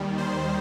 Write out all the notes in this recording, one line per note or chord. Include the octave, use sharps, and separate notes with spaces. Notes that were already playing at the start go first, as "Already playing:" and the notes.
Already playing: D#2 D#3 G3
C5